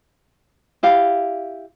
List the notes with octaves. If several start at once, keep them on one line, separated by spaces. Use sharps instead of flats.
E4 G4 F5